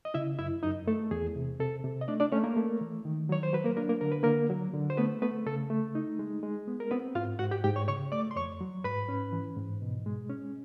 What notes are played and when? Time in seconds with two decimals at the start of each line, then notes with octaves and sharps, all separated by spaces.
0.05 D#5
0.14 C#3 E4 E5
0.39 F#2 E4 E5
0.63 F#2 D#4 D#5
0.87 A3 A4
1.11 E2 G#4
1.36 C3
1.60 C3 A4
1.84 C3
2.01 D#5
2.08 A3 D4 D5
2.20 D4 D5
2.32 A3 C#4 C#5
2.44 A#3 A#4
2.57 A3
2.81 E3
3.05 D#3
3.29 F#3 C#5
3.43 C5
3.53 F#3 B4
3.64 A#3 A#4
3.77 A#3 D4 A#4
3.89 A#3 A#4
4.01 D3 A#4
4.12 B4
4.23 D3 A#3 A#4
4.50 F#3
4.74 D3
4.90 C5
4.97 A3 B3 B4
5.22 A3 B3 B4
5.46 C#3 A4
5.70 A3
5.95 D#4
6.19 G#3
6.43 G#3
6.68 B3
6.80 A#4
6.91 B3 C4 B4
7.15 G#2 F4 F5
7.39 G#2 F#4 F#5
7.51 G4 G5
7.64 G#2 G4 G5
7.76 C#5 C#6
7.88 C#3 C#5 C#6
8.12 A3 D5 D6
8.31 C6
8.36 F2 C#5 C#6
8.61 F#3
8.84 G#2 B4 B5
9.09 C#4
9.32 E3
9.57 G#2
9.82 B2
10.06 G#3
10.30 C#4